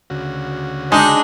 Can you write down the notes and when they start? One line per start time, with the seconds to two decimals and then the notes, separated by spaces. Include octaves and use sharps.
0.10 D2 C#3 F#4
0.92 G#3 D4 D#4